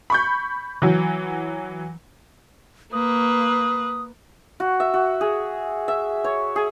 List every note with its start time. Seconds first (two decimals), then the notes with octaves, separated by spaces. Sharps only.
0.10 B5 C#6 G6
0.82 E3 F#3
2.93 A#3 B4 D#6
4.60 F#4
4.80 E5
4.94 F#4
5.21 G#4
5.88 E5
6.24 C#5
6.56 G#4